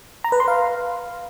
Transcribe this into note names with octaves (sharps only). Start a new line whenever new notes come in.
A#5
B4
C6
F5